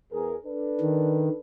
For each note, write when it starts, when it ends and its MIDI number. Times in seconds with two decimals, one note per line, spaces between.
0.12 0.35 40
0.12 0.35 68
0.12 0.35 70
0.45 1.39 62
0.45 1.39 69
0.45 1.39 71
0.81 1.29 51